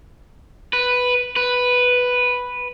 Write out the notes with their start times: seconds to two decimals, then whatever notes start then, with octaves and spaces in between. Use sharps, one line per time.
0.73 B4
1.36 B4